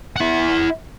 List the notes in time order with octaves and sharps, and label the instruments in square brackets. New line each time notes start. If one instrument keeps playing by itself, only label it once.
[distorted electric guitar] E4 F#5